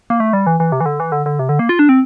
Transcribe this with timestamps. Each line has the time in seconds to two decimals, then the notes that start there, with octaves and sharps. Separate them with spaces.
0.10 A#3
0.20 A3
0.33 G3
0.46 E3
0.60 E3
0.72 C3
0.80 E3
0.86 D3
1.00 E3
1.12 D3
1.26 D3
1.39 C3
1.49 D3
1.59 A#3
1.69 F4
1.79 D4
1.89 C4